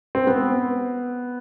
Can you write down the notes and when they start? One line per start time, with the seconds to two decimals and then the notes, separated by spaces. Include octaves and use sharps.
0.15 C4
0.27 B3